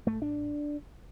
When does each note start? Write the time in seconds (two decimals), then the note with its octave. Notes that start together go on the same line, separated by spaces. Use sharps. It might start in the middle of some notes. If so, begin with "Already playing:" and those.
0.06 G#2 A3
0.22 D4